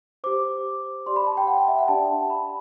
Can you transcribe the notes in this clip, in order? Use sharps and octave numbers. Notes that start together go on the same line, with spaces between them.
G4 C5 D6
G4 D5 C6
B5
A5
G5
F#5
F#5
E5
F#5
D4 G4 D5 A5
B5